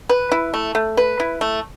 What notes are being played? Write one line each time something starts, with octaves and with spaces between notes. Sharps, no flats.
B4
E4
A3
A3
B4
E4
A3